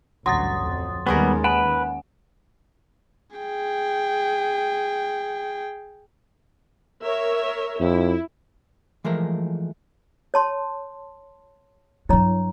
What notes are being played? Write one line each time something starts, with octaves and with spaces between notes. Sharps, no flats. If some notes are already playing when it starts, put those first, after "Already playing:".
A1 D2 G2 F#3 C6 D#6 A6
F2
D#2 D#3 G3 G#3 B3 C#4 G#4 A#4
B4 F#5 G#5
G#4 G5
A#4 C#5 E5
F2 E4
E3 F3 G#3 A3 A#4
C#5 A5 C6
G2 F#3 E4 C#5 A#5